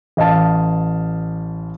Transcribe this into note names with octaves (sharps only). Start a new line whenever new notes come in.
A1 D#5 F5 A5